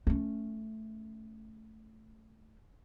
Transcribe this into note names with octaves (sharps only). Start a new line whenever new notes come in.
A3 C#4